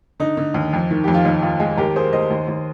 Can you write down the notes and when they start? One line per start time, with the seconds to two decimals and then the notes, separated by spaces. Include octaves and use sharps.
0.20 D3 D#4
0.37 D3
0.54 D#2
0.73 F2
0.91 D#3
1.04 F2 G4
1.14 F4
1.25 D#2 D#4
1.42 D#2 F4
1.60 G#3
1.77 D#2 G4 A#4
1.95 A#3 G#4 C5
2.13 D#2 C5 D#5
2.31 D#2
2.48 D#2